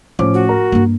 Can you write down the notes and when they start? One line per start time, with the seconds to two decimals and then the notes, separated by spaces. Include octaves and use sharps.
0.19 A2 F3 C#4 D6
0.34 F#4
0.49 A#4 A#5
0.72 G2 A#3